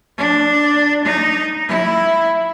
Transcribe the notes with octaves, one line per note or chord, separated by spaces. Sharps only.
D4
D#4
E4